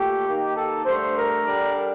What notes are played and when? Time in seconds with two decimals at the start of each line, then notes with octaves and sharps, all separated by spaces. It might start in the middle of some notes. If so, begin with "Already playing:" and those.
Already playing: A#2 A3 G4
0.26 D#3 A#3 D#4
0.56 A4
0.85 G2 D3 A3 D4 C5
1.15 A#4
1.45 D3 G3 D4